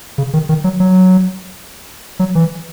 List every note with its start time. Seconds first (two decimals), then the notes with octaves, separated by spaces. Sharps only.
0.18 C#3
0.33 D#3
0.49 D#3
0.64 F#3
0.80 F#3
2.19 F#3
2.35 E3